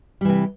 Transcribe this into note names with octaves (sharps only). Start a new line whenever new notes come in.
C3 E3 G3